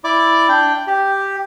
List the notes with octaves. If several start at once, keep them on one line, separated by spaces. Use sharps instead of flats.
E4 D5 D6
D4 G5
G4